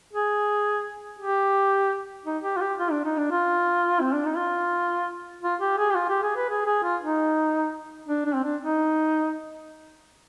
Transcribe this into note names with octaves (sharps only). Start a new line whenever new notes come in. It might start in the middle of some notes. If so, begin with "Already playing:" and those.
G#4
G4
D#4
G4
F4
G4
F4
D4
D#4
D4
F4
C4
D4
D#4
F4
F4
G4
G#4
G4
F4
G4
G#4
B4
G#4
G#4
F4
D#4
D4
D4
C4
D4
D#4